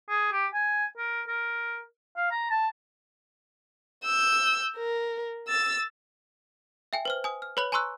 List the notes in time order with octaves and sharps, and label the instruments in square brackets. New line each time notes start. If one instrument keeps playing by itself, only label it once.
[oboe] G#4
G4
G#5
A#4
A#4
F5
A#5
A5
[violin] E6 G6
A#4
E6 A6
[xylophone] E5 G5 G#5
B4 C5 F6
G#5 D#6
F6
B4 C#5 B5 F#6 F#7
G#5 A#5 C6 C#6 E6 F#6